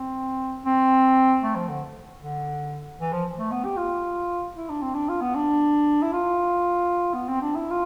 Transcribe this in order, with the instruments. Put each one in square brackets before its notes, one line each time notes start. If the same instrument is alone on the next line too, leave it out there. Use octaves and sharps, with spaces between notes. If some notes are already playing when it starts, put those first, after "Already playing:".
Already playing: [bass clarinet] C4
C4
A3
F3
D3
D3
E3
F3
A3
B3
G4
F4
E4
D4
C4
D4
F4
B3
D4
E4
F4
B3
C4
D4
E4
F4